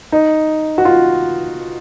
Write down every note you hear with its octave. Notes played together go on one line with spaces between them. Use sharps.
D#4
F#4
F4